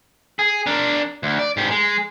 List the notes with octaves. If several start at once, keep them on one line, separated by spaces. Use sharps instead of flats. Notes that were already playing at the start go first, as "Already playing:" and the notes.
G#4
D4 A#4
D2
D5
G#2 G4
G#3